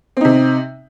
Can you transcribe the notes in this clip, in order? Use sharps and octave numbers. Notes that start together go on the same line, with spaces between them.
C3 C4 D#4